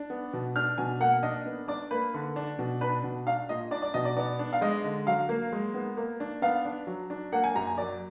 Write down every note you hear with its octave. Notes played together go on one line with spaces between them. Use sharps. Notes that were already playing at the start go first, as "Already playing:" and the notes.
Already playing: D4
B3
B2
D4 F6
B2 G#5
A#3 F#5
D4 D#5
B3
D4 D5
A#3 B4
D3
D4
B2
D4 B4
B2
D4 F5
A#2 D#5
D4 D5
D5
B2 D#5
D5
B3 D5
D4
F5
G#3 D#5
D3
F#3 F5
A#3
G#3
B3
A#3
D4
B3 F5
D4
F#3
D4
A#3 F#5
G#5
F#2 A#5
G#5
F#3 D5